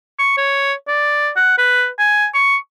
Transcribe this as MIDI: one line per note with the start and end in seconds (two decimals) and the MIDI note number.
0.19 0.37 85
0.38 0.73 73
0.88 1.30 74
1.37 1.55 78
1.58 1.89 71
1.99 2.28 80
2.34 2.57 85